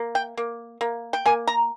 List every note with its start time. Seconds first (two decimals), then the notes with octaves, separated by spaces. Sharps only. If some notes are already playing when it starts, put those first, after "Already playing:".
Already playing: A#3
0.15 G5
0.37 A#3
0.81 A#3
1.13 G5
1.26 A#3 G#5
1.47 A#5